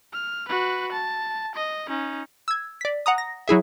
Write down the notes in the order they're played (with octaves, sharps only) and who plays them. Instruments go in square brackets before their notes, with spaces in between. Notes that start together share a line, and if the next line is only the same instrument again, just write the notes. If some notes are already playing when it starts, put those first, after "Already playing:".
[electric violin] F6
F#4 B4
A5
D#5
C#4 D#4
[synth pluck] E6 G#6
D5 B6
F#5 A#5 D#6
A#6
F#3 E4 G#4 E5